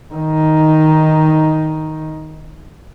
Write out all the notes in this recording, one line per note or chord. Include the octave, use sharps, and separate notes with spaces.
D#3 D#4